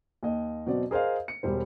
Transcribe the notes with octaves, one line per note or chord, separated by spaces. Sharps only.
D#2 D#5
B2 F#3 C4 D5
G#4 A#4 C5 D#5 F5
C#7
E1 G3 C5